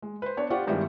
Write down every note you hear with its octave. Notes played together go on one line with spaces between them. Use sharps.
G#3
B4 C5
B3 D4 C#5
F4 G4 C5 D5 F#5 C#6
G2 D#3 G3 G#3 B3 E4